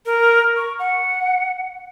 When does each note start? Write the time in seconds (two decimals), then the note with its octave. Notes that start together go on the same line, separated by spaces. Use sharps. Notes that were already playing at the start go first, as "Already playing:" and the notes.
0.06 A#4
0.56 C#6
0.79 F#5